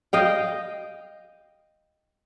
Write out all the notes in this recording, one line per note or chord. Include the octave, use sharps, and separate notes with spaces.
D#5 F5 G5